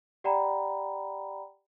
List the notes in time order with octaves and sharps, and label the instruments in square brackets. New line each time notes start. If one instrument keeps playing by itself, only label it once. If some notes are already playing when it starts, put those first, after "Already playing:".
[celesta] G4 D5 F#5 G5 A#5 B5